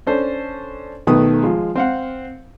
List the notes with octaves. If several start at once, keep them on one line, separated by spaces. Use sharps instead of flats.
C#4 D4 A4 C5
B1 B2 D#3 A3 B4 D#6
F3 G#3
C4 F5 F#5